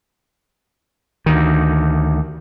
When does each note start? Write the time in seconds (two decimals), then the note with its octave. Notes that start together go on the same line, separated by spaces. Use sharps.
1.26 D2 D#3